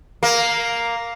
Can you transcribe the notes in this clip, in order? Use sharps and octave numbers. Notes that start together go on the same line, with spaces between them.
A#3